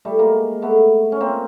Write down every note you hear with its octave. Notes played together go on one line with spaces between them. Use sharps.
G3 A3
G#3 A#3
A3 B3
C#4
A#3 C4